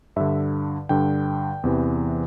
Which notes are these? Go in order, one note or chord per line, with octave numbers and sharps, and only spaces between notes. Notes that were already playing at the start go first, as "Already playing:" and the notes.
G2 D3 E5
G2 D3 G5
E2 C3 E3